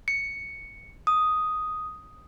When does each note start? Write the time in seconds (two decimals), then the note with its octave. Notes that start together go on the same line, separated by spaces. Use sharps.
0.08 C#7
1.07 D#6